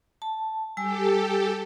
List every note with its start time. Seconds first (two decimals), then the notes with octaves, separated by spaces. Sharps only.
0.22 A5
0.77 G3 G4 A4 G#5 E6